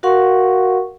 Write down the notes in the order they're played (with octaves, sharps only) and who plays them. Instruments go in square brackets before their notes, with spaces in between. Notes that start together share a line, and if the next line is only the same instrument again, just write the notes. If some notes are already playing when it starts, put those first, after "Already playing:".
[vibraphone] F#4 A#4 F5 F#5 C6 C#6